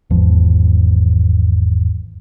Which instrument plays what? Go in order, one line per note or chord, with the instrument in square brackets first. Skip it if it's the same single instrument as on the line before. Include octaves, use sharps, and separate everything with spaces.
[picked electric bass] G#1 E2 F3